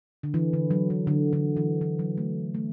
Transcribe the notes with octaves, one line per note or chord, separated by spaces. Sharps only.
D3
E3
D3
F#3
E3
D3
D3
E3
E3
F#3
A3
A3